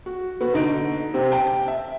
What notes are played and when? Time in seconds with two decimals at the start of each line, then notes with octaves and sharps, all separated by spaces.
0.06 F#4
0.41 B3 F#4
0.54 D3 D#4 D7
1.14 C3 C4
1.32 G5 A5
1.68 E5